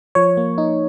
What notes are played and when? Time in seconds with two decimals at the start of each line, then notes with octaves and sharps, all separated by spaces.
0.15 F3 C#5
0.37 A#3
0.58 D#4